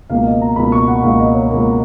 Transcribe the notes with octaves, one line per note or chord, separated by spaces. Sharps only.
C#2 B2 A#3 F5
D#5
A#5
C#2 B2 A#3 B5
C#6
F#5
C#2 B2 A#3 F5
D#5
C#5
C#2 B2 A#3